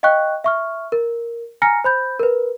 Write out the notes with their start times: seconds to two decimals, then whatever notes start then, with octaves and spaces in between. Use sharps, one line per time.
0.03 D#5 F5 G5 C#6 F#6
0.44 E5 C#6 F6
0.92 A#4
1.62 G#5 A#5 F6 A#6 C#7
1.84 C5 B5 G6
2.19 A#4 B4